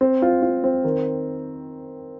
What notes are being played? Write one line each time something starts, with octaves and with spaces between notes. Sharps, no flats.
C4
F4
F4
C4
D#3